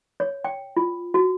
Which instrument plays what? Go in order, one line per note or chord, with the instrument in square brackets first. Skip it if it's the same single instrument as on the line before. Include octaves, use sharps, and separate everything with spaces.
[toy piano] C#5
G5
F4
F#4